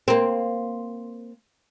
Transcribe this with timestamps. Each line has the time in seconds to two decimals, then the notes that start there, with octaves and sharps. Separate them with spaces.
0.08 A#3 C4